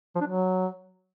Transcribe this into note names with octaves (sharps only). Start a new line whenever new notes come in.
F3
D4
F#3